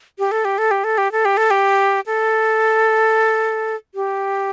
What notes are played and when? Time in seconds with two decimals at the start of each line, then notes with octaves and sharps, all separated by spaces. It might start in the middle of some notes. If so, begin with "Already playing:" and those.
0.19 G4
0.32 A4
0.45 G4
0.58 A4
0.71 G4
0.84 A4
0.98 G4
1.12 A4
1.25 G4
1.37 A4
1.51 G4
2.06 A4
3.95 G4